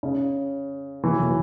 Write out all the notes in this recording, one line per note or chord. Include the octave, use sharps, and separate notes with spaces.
C#3
E3
F#3
E3